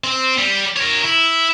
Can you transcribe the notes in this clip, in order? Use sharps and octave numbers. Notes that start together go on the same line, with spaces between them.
C4
G3
A#4 C#5
E4